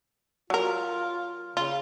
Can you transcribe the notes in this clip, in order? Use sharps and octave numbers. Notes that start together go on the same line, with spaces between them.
F#3 F4 A#4
C#3 F4